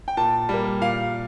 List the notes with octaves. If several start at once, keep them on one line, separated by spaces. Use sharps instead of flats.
G5
A#2 A5
G3 A#3
A#2 F5